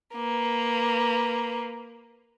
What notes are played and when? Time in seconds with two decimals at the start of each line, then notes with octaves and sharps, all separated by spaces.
0.15 A#3 B4